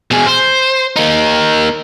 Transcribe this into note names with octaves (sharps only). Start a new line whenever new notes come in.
B2 G#4
C5
A#3 D#4